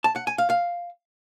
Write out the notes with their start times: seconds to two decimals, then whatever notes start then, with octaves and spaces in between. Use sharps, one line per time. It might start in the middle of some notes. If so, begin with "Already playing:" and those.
0.04 A5
0.16 F#5
0.27 G#5
0.38 F5
0.50 F5